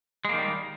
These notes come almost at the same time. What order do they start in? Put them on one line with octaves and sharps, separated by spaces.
G#3 A#3 D#3 G3